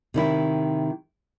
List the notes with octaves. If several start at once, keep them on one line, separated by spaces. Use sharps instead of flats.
C3 D#3 E4